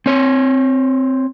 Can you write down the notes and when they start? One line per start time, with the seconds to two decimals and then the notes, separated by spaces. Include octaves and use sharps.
0.06 C4 C#5